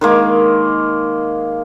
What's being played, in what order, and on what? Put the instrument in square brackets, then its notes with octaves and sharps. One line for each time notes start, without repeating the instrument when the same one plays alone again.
[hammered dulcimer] D#3 G#3 A#3